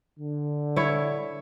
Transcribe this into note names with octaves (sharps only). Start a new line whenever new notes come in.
D3
E4 C#5